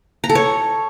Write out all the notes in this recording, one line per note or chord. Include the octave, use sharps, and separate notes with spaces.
A#5
A4
C#5